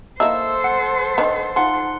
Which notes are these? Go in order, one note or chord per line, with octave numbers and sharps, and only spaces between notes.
A#3 D#4 E4 A4 C5 E6
F#5
D#3 D4 B4
F3 D#4 F#5 C6